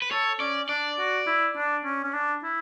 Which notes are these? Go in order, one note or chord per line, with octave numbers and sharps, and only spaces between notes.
B4
A4 C#5
C#4 D5
D4 D5
F#4
E4
D4
C#4
C#4
D4
E4